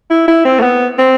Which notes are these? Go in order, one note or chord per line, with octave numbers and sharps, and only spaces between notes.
E4
E4
C4
A3
B3
C4